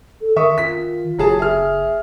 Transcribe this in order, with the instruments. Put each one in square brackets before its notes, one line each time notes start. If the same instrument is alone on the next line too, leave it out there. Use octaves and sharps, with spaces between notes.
[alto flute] A4
[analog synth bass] D#3 [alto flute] A#4 [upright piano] E5 C#6 D#6
[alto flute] F4 [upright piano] B6
[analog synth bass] F#1 [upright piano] F#3 G#4 A5
[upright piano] G#4 F6 [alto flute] E5